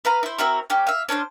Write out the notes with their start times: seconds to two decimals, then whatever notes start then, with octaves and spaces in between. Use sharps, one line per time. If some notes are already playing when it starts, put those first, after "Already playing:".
0.05 B4 F5 A#5
0.23 E4 C5
0.38 C4 E4 F#4 A#4
0.70 A#3 C#4 G4
0.87 E5 F5
1.09 C#4 D4 B4 C5